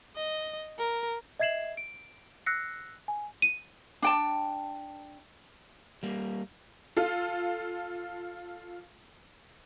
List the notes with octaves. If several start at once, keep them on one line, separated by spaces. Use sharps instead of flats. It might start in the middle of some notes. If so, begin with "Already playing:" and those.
D#5
A#4
D#5 E5 G#6 C7 E7 F#7
D7
E6 F#6 A#6 C7 C#7
G#5
D#7
D4 G5 A5
G3 A#3
F4 A4 F5